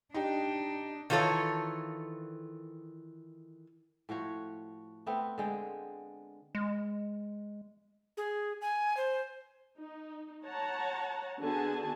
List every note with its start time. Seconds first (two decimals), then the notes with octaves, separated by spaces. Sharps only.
0.14 D4 D#4 G4
1.10 D#3 E3 F4 A4 C#5
4.09 A2 F3 F#4 C#5
5.06 A3 B3 C4
5.38 D3 G#3 G5
6.55 G#3
8.17 G#4
8.61 G#5
8.97 C5
9.78 D#4
10.44 C#5 F#5 A5 A#5
11.40 D3 B3 F#4 G#4 G#5 A5